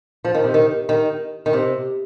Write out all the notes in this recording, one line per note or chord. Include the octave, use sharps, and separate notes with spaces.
F3
D#3
C3
D#3
D#3
D#3
C3